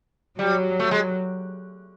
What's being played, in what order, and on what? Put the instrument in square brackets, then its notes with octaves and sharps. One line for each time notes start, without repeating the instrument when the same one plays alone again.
[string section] F#3 [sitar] G3
[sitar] A3
G#3